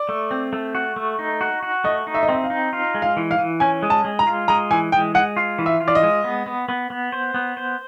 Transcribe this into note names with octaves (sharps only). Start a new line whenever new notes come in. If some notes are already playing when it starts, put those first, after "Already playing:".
Already playing: D5
A3
C4
A3
F#4
A3
D#4
F#4
F#4
A3 D#5
D#4
E5
D#5
C4 E5
F5
D#4
F4
G#3
F5
E3
F5
E3
C#4 G#5
G#3
A5
G#3
A#5
F4
G#3 A#5
E3 G#5
G#3 G5
G#3 F#5
F4
E3
E5
F4
D5
D#5
G#3
B3
B3
B3
B3
C5
B3
C5